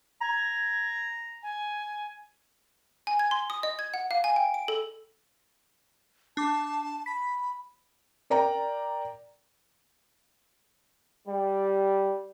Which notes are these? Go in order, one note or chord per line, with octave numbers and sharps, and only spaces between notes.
A#5 G#6
G#5
G#5
G#6
C6
D#6
D#5
G#6
F#5
F5
G#5
G5
D7
A4
D4 A5 D6
B5 B6
A#4 D5 G5 A#5
G3